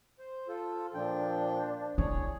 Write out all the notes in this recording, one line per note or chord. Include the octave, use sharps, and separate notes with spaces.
C5
F4 A4
A#2 F3 D4 G5
E4 G#4 C#5